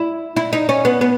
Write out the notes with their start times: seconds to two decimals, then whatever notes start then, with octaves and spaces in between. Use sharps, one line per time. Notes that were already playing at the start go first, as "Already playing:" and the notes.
Already playing: E4
0.36 E4
0.53 D#4
0.69 C#4
0.85 B3
1.01 B3